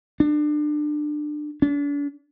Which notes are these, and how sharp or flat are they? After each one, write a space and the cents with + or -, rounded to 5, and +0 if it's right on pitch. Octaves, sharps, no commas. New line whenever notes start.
D4 +25
D4 -40